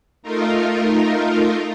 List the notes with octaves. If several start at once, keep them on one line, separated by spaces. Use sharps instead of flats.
A3 D#4 F4 A#4